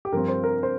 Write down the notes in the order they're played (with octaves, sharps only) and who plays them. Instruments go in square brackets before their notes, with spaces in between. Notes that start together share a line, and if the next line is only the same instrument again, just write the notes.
[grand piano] G4
G2 F3 C4 A#4
C5
A#4
C5